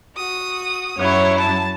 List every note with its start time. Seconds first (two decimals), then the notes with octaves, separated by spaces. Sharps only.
0.16 F#4 D#6
0.98 F#2 F#3 E4 C#5
1.39 A5